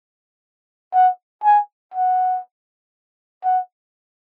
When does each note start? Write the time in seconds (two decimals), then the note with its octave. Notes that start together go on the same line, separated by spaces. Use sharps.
0.94 F#5
1.44 G#5
1.94 F#5
3.44 F#5